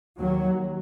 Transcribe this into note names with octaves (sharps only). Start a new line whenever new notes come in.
D#2 F#3